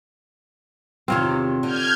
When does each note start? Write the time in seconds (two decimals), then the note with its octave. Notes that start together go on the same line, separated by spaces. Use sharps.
1.08 E2 C3 D#3 C4 F4 C#5
1.63 D3 F6 G6 G#6